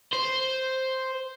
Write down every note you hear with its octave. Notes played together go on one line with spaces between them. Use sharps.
C5